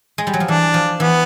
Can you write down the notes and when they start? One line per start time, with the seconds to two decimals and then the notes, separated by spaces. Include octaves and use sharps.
0.18 G#3
0.27 G3
0.34 F#3
0.40 F3
0.48 E3 D4
0.74 F3
1.00 E3 B3